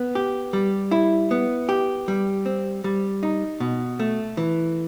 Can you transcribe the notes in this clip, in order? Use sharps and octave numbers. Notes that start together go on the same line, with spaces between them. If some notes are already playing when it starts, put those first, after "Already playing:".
Already playing: B3
G4
G3
E4
B3
G4
G3
C4
G3
D#4
B2
A3
E3